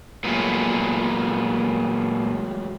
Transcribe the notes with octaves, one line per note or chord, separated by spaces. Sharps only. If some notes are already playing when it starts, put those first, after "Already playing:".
A#2 F#3 G#3 A3 B3